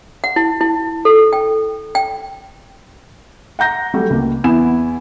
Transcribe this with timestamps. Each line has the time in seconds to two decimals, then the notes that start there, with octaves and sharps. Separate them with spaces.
0.24 F#5
0.36 E4
0.61 E4
1.05 A4
1.33 G5
1.95 G5
3.59 F#5 A#5 G6 A#6
3.94 F#3 G3 A3
4.10 C#2 A#3
4.44 E2 B3 E4 G#5 E7